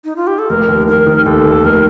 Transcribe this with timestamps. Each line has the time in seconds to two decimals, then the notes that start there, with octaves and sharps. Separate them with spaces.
0.04 D#4
0.16 F4
0.27 G4
0.39 A4
0.50 F1 A#4
0.69 D#2
0.87 D#3 A#4
1.06 D#3
1.26 D#2 A4
1.46 D#2
1.64 F1 A#4